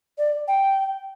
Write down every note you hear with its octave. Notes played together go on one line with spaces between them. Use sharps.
D5
G5